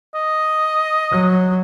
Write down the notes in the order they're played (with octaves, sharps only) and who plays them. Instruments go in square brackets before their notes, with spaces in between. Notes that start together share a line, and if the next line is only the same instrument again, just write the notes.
[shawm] D#5
[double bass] F#3